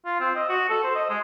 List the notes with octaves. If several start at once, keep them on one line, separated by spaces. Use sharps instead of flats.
F4
C4
D#5
F#4
A4
C5
D#5
G#3